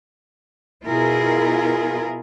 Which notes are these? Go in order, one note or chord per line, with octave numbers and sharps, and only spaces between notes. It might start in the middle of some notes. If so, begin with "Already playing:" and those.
B2 E4 F4 G#4 A#4